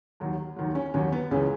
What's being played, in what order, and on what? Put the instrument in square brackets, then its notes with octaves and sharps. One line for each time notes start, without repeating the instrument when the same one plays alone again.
[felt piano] D#2 D#3 F#3
D#2 D#3 F#3
C#4
D#2 D#3 F#3 C#4
B3
C#2 C#3 E3 C#4